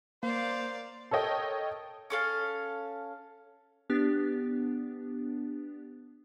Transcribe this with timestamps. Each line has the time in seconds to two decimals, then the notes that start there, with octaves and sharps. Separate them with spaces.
0.23 A#3 C5 D5 F5
1.11 A4 A#4 C#5 D#5 G5
2.10 C#4 A4 F5
3.90 B3 D4 G4